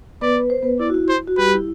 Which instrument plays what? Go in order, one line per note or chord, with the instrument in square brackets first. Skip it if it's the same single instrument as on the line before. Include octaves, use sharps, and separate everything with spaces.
[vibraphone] B3 B4 [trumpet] D5
[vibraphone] B4
C5
B3 B4
[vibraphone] E4 [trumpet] D5
[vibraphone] F#4
E4
[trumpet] C5
[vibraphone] F#4
[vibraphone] G3 G4 [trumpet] B4
[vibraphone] E4